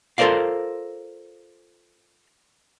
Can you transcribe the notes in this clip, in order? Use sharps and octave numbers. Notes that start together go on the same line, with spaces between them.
F4 A4 A#4 C5 D5 F5